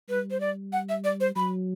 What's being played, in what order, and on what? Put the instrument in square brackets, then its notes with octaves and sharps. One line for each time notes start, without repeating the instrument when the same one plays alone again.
[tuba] G3 [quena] B4
[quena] C5
D5
F#5
E5
D5
C5
[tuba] F#3 [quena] B5